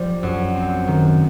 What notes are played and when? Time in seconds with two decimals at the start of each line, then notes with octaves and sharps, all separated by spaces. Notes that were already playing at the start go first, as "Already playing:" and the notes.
Already playing: F3 G3
0.23 F#2
0.55 C4
0.88 D#3